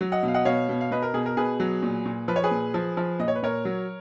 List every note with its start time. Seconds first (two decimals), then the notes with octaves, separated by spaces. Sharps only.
0.01 F#3
0.12 D#5 F#5
0.23 B2
0.28 F5
0.34 D#5 F#5
0.45 B2 C#5 F5
0.69 B2
0.81 F5
0.91 B2 B4 D#5
1.02 A#4
1.14 B2 G#4
1.26 A#4
1.37 B2 G#4 B4
1.60 F#3
1.83 A#2
2.06 A#2
2.28 F3 B4
2.36 C#5
2.44 G#4 B4
2.51 A#2
2.74 F3
2.97 F3
3.19 A#2 D#5
3.28 C#5
3.35 B4
3.43 A#2 A#4 C#5
3.65 F#3